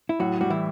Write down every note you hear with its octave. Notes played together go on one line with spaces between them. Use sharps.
E4
A2 F#3 F#4
G3 F#4
E3 E4